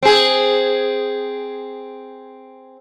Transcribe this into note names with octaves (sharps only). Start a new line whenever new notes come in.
C4 G#4